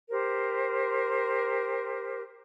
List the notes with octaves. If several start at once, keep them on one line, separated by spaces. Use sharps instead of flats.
G4 A#4 C5